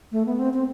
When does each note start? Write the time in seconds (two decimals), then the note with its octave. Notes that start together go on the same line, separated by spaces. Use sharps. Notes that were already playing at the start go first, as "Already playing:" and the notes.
0.12 A3
0.26 B3
0.39 C4
0.53 C4